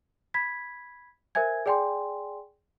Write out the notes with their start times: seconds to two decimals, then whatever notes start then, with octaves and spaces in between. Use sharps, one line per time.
0.34 B5 G#6 B6
1.35 A#4 C5 E5 G#5 G#6
1.66 G#4 D5 G5 G#5 C6